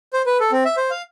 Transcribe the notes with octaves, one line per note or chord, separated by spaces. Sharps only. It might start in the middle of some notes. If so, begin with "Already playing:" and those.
C5
B4
A4
C4
E5
C5
F5